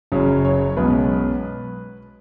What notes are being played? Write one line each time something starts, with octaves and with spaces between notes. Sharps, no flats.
F#1 F#2 C#3 F#3 C#5
C#5
B1 B2 G#3 C#4 B4